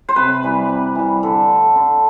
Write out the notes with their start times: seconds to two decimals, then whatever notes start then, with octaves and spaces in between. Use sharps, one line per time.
0.09 C5
0.16 C3 B4
0.43 E3 G3
0.69 C3
0.95 E3 G3
1.23 D3 A4
1.49 A3
1.76 D3